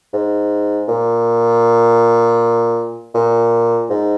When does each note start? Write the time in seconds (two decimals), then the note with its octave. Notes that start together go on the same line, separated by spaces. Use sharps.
0.13 G#2
0.88 A#2
3.15 A#2
3.90 G#2